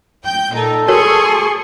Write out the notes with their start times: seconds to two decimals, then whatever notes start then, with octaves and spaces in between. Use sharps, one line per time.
0.24 G5 G6
0.55 A#2 D#4 A4
0.88 F#4 G#4 A#4 C#5 C6 C#6